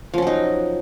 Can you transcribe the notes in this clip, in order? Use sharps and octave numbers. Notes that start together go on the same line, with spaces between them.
F3 F#3 C#4 D#4